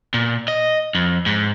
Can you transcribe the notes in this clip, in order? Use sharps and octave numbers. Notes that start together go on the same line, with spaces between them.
A#2
D#5
F2
G#2